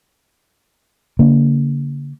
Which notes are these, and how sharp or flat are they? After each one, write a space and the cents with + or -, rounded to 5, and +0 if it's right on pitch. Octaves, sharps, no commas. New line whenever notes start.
D3 -45 A#3 -10